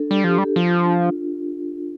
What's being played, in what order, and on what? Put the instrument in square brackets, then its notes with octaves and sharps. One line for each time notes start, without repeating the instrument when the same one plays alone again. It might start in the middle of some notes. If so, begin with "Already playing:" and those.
Already playing: [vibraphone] D4 A4
[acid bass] G3 [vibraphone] G4
[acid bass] F3 [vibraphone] G4
[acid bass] G3 [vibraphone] A4
[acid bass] F3 [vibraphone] F4
[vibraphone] D4